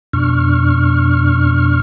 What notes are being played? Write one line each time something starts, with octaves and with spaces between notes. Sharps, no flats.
F2 B2 D4 C#6 F6